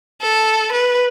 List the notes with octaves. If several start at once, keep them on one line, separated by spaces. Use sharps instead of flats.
A4
B4